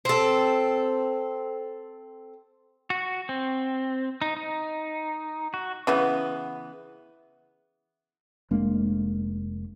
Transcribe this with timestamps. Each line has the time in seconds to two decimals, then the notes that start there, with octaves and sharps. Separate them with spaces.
0.05 C4 A4
2.90 F#4
3.29 C4
4.22 D#4
4.36 D#4
5.54 F#4
5.87 C#3 E3 B3
8.51 F1 G#3 A#3 D4